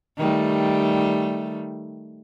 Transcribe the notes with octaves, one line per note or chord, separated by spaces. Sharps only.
D#3 G3 A3